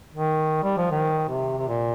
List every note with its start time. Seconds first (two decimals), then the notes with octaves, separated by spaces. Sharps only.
0.14 D#3
0.63 G3
0.78 F3
0.91 D#3
1.28 C3
1.58 C3
1.68 A#2